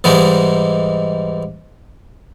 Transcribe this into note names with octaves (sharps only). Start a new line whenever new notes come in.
G#2 E3 G3 G#3 D#4